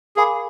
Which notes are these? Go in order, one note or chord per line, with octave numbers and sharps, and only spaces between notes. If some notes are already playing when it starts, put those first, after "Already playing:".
G#4 A#4 F5 G#5 B5 D6